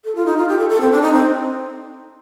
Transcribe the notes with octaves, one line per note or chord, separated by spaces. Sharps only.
A4
F4
D#4
F4
G4
A4
A4
C4
D4
D#4
C4